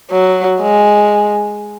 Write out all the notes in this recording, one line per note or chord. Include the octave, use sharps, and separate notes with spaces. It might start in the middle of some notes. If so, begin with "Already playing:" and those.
F#3
G#3